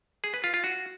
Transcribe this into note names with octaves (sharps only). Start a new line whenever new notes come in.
G#4
B4
F4
F4
F#4